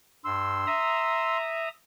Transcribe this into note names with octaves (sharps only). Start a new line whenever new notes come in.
G2 C6 E6
E5 A#5 D#6